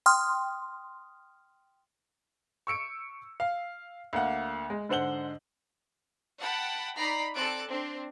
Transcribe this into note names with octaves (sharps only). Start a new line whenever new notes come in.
G5 C6 D#6 F6
C#6 E6 C#7 D7
F5
D2 A#3 F#5
G#3
G#2 D3 C5 F#5 F#7 G7
F#5 G5 A5 B5
D#4 D5 A#5 B5 B6 C7
C4 A4 D5 A5 F#6 D7
C4 D4